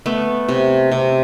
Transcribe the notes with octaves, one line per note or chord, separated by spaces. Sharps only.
A3 B3
C3
C3